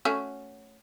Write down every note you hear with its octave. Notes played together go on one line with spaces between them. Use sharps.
A3 C#4 F#4